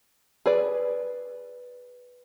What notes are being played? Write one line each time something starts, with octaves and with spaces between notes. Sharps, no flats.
G#4 B4 D5